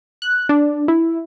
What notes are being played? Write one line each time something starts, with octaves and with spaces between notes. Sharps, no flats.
F#6
D4
E4